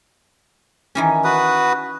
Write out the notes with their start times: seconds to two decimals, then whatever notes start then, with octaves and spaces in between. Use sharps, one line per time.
0.95 D#3 E3 C#4
1.24 F#4 B4 D#6